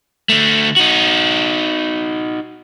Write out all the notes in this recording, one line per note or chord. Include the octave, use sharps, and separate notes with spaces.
D3 A3
D#4 F#4